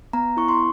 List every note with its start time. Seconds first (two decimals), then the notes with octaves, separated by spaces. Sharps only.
0.13 B3 A#5
0.37 E4 C#6
0.49 C6